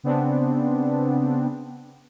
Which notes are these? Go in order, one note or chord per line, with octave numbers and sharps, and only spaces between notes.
C#3 B3 C4 D4